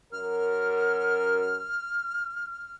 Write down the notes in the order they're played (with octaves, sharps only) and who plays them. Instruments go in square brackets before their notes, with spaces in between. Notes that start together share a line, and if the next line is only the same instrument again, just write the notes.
[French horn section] F#2 A#4 [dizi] F6